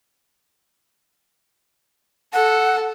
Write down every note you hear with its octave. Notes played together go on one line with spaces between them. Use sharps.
A4 F#5